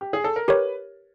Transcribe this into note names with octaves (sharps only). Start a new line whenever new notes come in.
G4
G#4
A4
A#4
G4 A#4 B4 C#5